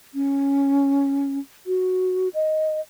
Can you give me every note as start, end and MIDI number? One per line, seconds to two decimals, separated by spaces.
0.14 1.39 61
1.66 2.29 66
2.34 2.80 75